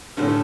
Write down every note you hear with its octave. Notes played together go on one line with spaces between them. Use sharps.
A2 D3 F3 A3 C#4